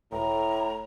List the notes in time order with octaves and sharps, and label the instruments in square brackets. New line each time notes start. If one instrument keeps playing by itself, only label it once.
[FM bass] E1 [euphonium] A2 [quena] A#5